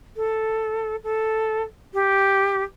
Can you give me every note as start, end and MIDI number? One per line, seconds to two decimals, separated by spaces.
0.16 0.96 69
1.03 1.62 69
1.93 2.63 67